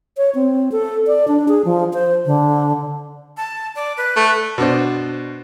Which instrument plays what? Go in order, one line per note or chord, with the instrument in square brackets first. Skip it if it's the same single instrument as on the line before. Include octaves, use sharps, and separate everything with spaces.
[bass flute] C#5
C4
A4
D5
D4
G#4
F3
C5
D3
[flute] A5
D5
B4
[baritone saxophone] A3
[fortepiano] B2 D4 C5